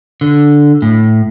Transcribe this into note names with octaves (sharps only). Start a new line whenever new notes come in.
D3
A2